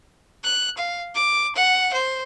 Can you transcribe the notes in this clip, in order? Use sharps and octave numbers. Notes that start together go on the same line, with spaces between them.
F#6
F5
D6
F#5
C5